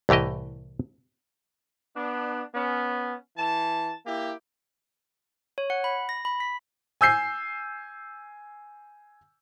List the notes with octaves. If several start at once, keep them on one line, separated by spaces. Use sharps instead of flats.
C2 A2 E3 G4 D#5
B3 D4
B3 C#4
E3 A5
A#3 E4 G4
C#5
F#5
B5
A#6
B5
B6
G#5 E6 G6 C7